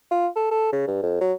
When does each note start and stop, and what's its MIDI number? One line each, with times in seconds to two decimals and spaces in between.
0.11 0.28 65
0.36 0.47 69
0.51 0.72 69
0.73 0.86 49
0.88 1.01 43
1.03 1.16 41
1.21 1.33 54